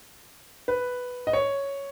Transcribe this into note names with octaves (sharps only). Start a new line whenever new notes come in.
B4
D#5
C#5